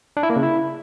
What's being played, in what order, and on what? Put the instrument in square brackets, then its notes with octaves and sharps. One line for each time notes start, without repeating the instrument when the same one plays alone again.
[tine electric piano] D4
E4
A#3
C#3
E4